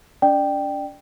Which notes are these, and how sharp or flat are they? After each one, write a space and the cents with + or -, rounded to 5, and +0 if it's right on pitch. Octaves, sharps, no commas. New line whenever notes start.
D4 -40 D5 +30 G5 +0